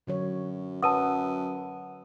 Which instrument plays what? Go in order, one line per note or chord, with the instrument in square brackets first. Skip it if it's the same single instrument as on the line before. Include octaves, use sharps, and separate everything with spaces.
[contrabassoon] F#2 [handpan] D3 F#3 C#5
[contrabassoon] F#2 [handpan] C#4 B4 [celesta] F#5 E6 D#7 [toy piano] A5 D#6